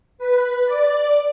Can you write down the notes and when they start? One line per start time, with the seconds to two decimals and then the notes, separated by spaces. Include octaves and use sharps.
0.18 B4
0.66 D5